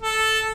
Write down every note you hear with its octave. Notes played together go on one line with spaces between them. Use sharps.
A4